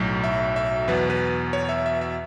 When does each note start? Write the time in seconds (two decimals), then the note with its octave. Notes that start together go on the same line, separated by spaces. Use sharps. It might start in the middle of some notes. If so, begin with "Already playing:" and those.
Already playing: B1 A2 F#3
0.24 E5
0.56 E5
0.88 E2 B2 F#3 B4
1.10 B4
1.53 C#5
1.69 E5
1.86 E5
2.01 E5